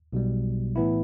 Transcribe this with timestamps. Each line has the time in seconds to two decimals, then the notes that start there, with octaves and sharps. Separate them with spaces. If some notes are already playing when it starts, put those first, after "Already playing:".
0.13 B1 B2 G3
0.76 A2 E3 B3 E4